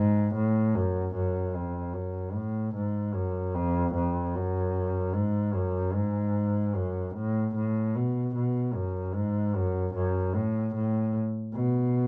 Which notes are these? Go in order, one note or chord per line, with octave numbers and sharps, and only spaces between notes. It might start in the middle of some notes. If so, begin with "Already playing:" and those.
Already playing: G#2
A2
F#2
F#2
F2
F#2
A2
G#2
F#2
F2
F2
F#2
G#2
F#2
G#2
F#2
A2
A2
B2
B2
F#2
G#2
F#2
F#2
A2
A2
B2